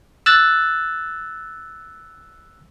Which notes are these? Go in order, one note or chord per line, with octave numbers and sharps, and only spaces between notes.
E6 F#6 A6